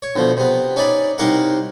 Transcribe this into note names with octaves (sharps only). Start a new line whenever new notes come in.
C#5
D2 B2 F3
C3 B3
C#4 D#4 D5 B5
C2 D#4 G4 A#4 F5 F#5